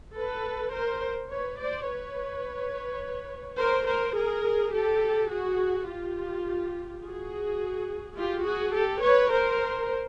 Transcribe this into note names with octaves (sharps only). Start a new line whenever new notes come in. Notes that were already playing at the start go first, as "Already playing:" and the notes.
A4 B4
A#4 C5
B4 C#5
C5 D5
B4 C#5
A#4 C5
A#4 C5
G#4 A#4
G4 A4
F#4 G#4
F4 G4
F#4 G#4
F4 G4
F#4 G#4
G4 A4
B4 C#5
A#4 C5